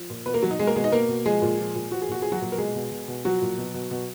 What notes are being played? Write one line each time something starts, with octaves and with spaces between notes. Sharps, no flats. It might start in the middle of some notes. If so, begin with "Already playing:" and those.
Already playing: F3
A#2
B2 B3 B4
A#3 A#4
B2 F#3 F#4
D#4
B2 G#3 G#4
A#3 A#4
B2 G#3 G#4
D#4 D#5
B2 A#3 A#4
B2
F3 G#3 G#4
A#2
F3
A#2
F3 F#4
G#4
A#2 F#4
F3 G#4
F#3 F#4
A#2
A#4
B2 G#3 G#4
B2
B2
B2
F3 F#3 F#4
A#2
B2
B2
B2